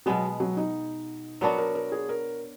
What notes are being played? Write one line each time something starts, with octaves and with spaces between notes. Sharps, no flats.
B2 F#3 G#3 B3
F#3
D#4
F#3 B3 D4 F#4 A#4
A#4
A#4
G#4
A#4